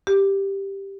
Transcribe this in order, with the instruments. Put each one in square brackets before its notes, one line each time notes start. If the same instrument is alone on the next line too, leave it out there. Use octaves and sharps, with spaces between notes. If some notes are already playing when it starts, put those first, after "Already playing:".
[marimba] G4